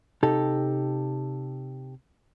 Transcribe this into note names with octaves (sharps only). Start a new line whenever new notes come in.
C3 D#4 G4 A4